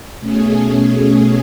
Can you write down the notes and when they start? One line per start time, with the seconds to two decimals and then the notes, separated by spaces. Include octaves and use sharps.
0.19 B2 A3 C#4 G#4